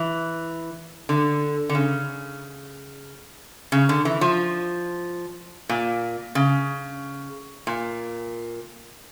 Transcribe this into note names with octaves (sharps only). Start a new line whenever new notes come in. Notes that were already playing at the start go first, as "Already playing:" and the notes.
Already playing: E3
D3
D3
C#3
C#3
D3
E3
F3
A#2
C#3
A#2